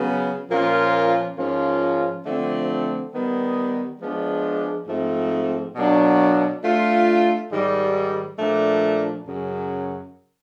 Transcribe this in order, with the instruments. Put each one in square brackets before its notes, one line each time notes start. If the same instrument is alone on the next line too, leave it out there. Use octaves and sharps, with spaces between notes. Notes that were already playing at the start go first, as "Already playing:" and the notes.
Already playing: [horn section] C#3 F#3 B3
A#2 F3 A#3 C#4 F4
G#2 F3 A#3 C#4 F4
D3 F3 A3 C4
D#3 G3 B3
F3 G#3 B3 D4
G#2 F3 A3 C4
B2 F#3 A#3 D4
A3 D4 F4
G#2 D#3 G3
A#2 F3 A3 D4
F#2 C#3 F#3